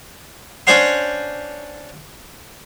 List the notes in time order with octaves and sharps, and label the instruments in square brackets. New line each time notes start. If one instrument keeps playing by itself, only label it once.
[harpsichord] C#4 D4 C5 C#5 F#5 C6